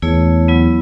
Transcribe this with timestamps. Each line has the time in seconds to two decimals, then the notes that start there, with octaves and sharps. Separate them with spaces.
0.02 E2 A3 E4 G#4 C#5
0.48 F#3 B3 E4